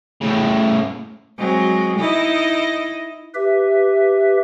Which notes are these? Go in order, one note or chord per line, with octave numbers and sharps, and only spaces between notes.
A2 C#3
F#3 G#3 C4
D#4 E4 D#5
G4 B4 E5